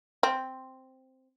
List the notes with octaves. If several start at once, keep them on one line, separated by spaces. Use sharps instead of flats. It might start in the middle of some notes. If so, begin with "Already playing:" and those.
C4